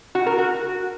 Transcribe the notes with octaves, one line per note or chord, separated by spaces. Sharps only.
F#4
A#4
F#4